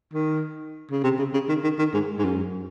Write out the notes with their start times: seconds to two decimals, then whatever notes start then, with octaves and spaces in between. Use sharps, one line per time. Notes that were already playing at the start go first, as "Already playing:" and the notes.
0.14 D#3
0.91 C#3
1.03 C3
1.19 C#3
1.33 C#3
1.49 D#3
1.64 D#3
1.79 D#3
1.94 G#2
2.19 G#2
2.25 F#2